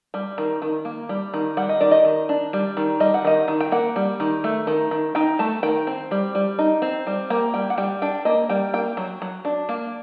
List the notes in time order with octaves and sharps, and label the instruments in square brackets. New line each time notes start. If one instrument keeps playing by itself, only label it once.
[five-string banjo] G3
D#3
D#3
A#3
G3
D#3
G3 F#5
D#5
D#3 D5
D#5
D#3
D4
G3
D#3
G3 D#5
F#5
D#3 D#5
D#3
G5
A#3 F#5
G3
D#3
A3
D#3
D#3
D#4 G5
A3 A5
D#3 G5
C4
G3
G3
D#4
C4
G3
A#3 G5
G3 G5
F#5
G3 G5
D4 G5
A#3 D#5
G3 G5
A#3 G5
F#3
F#3
D4
A#3